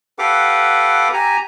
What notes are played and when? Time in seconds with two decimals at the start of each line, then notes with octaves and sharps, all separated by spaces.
0.19 G4 A4 B4 F5 F#5 D6
1.13 G4 G#5 A#5